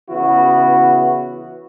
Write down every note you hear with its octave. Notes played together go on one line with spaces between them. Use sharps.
C#3 E3 B3 E4 F#4